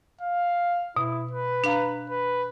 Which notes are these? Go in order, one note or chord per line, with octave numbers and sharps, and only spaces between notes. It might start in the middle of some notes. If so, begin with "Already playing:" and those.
F5
B2 E4
B4
D4 F5 A#5
B4